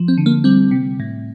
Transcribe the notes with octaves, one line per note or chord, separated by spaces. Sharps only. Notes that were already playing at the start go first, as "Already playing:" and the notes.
Already playing: F3
C4
D3
A#3
G3 C4
C3
A2